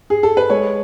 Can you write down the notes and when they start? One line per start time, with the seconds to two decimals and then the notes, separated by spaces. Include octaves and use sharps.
0.10 G#4
0.23 A4
0.37 B4
0.50 G#3 C#5